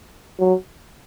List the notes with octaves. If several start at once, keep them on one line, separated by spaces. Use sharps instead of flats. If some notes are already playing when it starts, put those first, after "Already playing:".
F#3